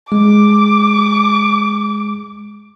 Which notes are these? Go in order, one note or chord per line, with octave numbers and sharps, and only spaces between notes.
G#3 D6